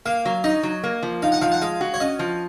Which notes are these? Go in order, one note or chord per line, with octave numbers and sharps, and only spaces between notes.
A#3 F5
F#3
D#4 D#5
F#3
A#3
F3
D#4 F5
F#5
F3 F5
F#5
G#3 F5
F#4
C#5
C#4 D#5
F3